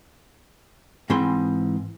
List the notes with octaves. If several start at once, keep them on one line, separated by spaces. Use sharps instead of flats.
G#2 E3 C4 G#4 B5 C6